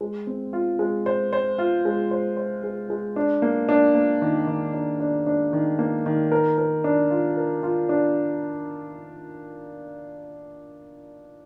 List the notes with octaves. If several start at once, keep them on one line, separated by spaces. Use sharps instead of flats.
G#3
C4
F4
G#3
C5
C5
F4
G#3
C5
C5
G#3
G#3
D4
A#3
D4
A#3
D#3
D#3
D4
D4
D4
D#3
A#3
D#3
A#4
A#4
D4
F4
A#4
F4
D4